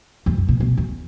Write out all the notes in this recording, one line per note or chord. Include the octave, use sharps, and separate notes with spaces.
E2
F#2
B2
B2
E2